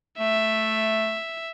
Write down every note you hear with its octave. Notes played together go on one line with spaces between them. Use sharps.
A3 E5